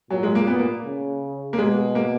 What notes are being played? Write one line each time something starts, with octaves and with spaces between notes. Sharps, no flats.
A#2 F#3
G#3
A#3
B3
A#3
C#3
A#3
B2 G#3
A#3